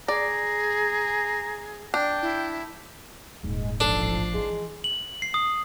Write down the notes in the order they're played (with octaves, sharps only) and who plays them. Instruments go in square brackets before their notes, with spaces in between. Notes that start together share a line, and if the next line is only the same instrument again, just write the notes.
[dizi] G#4 [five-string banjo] D5 [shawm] A#5
[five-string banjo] D4 [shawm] G5
[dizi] E4
[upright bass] D#1 G#2 [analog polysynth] G#3
[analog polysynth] A1 F3 C7 [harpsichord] D4 [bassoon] A4
[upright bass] E3 [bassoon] G#3
[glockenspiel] F#7
C7
D#6